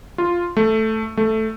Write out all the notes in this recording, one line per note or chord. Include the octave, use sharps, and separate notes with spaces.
F4
A3
A3